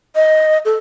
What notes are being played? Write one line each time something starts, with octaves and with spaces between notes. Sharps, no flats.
D#5
A4